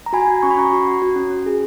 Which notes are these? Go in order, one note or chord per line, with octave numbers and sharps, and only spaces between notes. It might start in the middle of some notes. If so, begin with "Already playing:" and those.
A#5
F#4 G#5 B5
F#4
C#4 C#6
B5
C#4 A#5 C#6
F#4
F#4
F#4
C#4
C#4
G#4